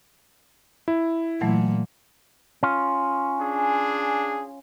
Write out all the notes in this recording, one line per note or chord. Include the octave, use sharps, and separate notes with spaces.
E4
A#2 E3 F#3 A3
C#4 F4
D4 G#4